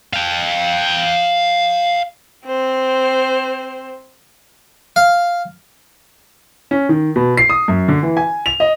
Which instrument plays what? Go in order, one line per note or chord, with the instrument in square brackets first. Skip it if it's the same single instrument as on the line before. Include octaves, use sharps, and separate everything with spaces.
[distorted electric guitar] F5 G5
[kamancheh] C4 C5
[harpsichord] F5
[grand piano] C#4
D#3
B2
C7
D#6
F#2
D3
E3
G#5
F7
D#5